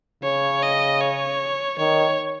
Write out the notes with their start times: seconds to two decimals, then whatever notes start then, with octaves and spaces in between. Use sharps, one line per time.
0.23 C#3 C#5
0.62 D#5
1.01 C#5
1.78 D#3 C#5